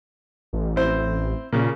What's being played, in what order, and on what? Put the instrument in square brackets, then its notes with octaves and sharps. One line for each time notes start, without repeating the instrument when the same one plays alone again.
[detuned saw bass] A1
[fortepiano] C4 E4 C5
[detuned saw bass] A#2 [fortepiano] C#3 A#3